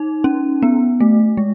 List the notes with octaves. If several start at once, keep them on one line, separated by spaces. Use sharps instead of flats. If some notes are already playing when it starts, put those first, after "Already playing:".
Already playing: D#4
C#4
B3
A3
G#3